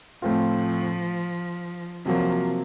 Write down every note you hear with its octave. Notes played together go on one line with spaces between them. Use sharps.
A2 F3 A3 C4 F4
C3 F3 F#3 A#3